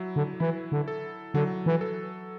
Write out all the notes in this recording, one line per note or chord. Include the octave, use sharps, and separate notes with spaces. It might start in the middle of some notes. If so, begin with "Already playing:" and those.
Already playing: F#3 E4
D3
E3 E4
D3
A4
D3 F#3
E3
A4